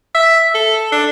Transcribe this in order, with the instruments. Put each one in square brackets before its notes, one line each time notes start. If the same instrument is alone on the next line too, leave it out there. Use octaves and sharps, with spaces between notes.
[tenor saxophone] E5
A4
D4